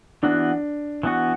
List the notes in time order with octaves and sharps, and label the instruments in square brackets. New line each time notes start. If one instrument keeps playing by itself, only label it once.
[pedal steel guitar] E3 B3 F#4 [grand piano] D4
[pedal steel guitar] E3 B3 F#4